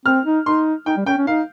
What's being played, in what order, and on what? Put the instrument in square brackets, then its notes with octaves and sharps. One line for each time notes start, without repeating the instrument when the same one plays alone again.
[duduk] C4 [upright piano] F6
[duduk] D#4
[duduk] D#4 [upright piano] C6
[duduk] D#4 [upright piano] G5
[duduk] G3
[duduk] C#4 [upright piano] G5
[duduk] C#4
[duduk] D#4 [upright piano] F5